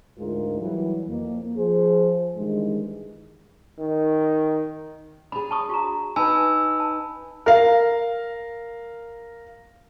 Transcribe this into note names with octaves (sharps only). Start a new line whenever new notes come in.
D2 G#2 G#3 F4 A#4
E3 F#3 G3
F2 A#3
F3 G#4 C5
G2 D#3 E3 G#3
D#3
D4 G#4 B5
A5 C#6 D#6
F#4 A#5
D#4 B4 G#5 A5 B5 E6
A5
A#4 F5